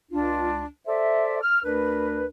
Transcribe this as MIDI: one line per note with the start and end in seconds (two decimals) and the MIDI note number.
0.12 0.64 37
0.12 0.64 62
0.12 0.64 65
0.87 1.38 69
0.87 1.38 72
0.87 1.38 74
0.87 1.38 76
1.42 1.59 89
1.64 2.27 38
1.64 2.27 62
1.64 2.27 70
1.64 2.27 71